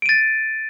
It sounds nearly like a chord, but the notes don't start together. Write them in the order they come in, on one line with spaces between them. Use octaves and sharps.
D7 D#7 A6